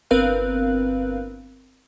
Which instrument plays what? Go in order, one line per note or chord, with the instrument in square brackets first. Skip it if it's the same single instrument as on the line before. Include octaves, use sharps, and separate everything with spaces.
[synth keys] G1 C4 A#4 B4 F5 F#6